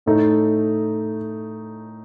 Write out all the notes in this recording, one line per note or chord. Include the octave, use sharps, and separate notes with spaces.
A2 A3 D#4